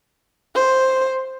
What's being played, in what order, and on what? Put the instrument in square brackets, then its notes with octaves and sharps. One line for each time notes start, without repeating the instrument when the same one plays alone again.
[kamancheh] C5